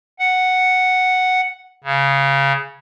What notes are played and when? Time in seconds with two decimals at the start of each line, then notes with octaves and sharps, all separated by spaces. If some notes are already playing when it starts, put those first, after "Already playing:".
0.19 F#5
1.84 C#3